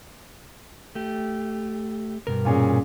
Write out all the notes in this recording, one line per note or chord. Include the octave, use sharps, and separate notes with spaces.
A3 G4
G2 B2 A#4
A#2 C#4 G#4